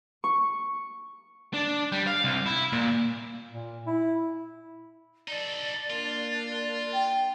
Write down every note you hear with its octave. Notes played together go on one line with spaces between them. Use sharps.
C#6
D4
G3
F5
C2
E4
A#2
A#2
E4
D#4 A4 D5
A#3 D4 F4
G5